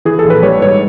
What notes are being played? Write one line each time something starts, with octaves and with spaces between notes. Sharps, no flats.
E3 G#4
A4
A#1
B4
G3 C#5
G#2 C#5